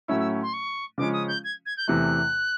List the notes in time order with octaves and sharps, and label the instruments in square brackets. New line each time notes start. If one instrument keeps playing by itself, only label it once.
[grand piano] A2 F#3 A3 C#4 E4 [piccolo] E6
[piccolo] E6
C6
C#6
[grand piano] C#3 F3 G#3 C#4 [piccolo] D6
[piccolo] D#6
G6
G#6
G#6
G6
[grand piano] E2 C3 E3 A3 [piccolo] F#6